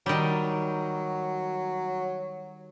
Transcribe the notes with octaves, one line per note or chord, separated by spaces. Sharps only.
D#3 F#3 G3